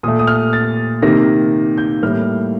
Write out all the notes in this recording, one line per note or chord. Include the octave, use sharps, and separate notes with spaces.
A#2 A3 D#6
D#6
F6
A6
C3 D#3 A#3 A#6
G6
A2 G3 A#3 F6